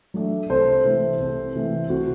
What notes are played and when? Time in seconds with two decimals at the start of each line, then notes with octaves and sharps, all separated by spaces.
0.14 F#3 A3 D4
0.50 C2 A4 C5
0.85 C3 E3 A3 E4
1.20 C2
1.55 C3 E3 A3 E4
1.90 C2 F#4